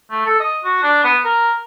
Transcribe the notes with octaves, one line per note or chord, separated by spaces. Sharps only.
A3
A4
D#5
F#4
D4
B3
A#4